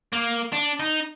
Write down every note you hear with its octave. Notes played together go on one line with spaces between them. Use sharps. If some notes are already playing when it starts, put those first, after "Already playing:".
A#3
D4
D#4